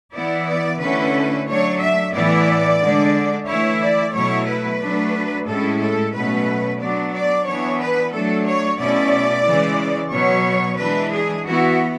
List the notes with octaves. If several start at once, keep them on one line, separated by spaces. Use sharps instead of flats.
E3 B3 E4 D5
D5
D3 A3 C#4 E4 B4
F#3 A3 D4 C#5
E5
A2 E3 B3 E4 D5
D3 G#3 D4
E3 A3 E4 C#5
D5
B2 F#3 A3 E4 C#5
B4
F#3 A3 D4
A2 G#3 C#4 E4 A4
A4
B2 F#3 A3 C#4 B4
F#3 B3 D4 D5
D5
E3 B3 D4 C#5
B4
F#3 A3 D4 A4
C#5
B2 A3 C#4 E4 D5
C#3 E3 G#3
B2 F#3 B3 C#5
E3 G#3 D4 B4
G#4
E3 B3 E4 F#4